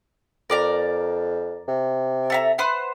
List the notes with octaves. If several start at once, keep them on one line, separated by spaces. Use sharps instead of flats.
F2 A#4 D5 A#5
C3
A4 E5 A#5
B4 C5 F#5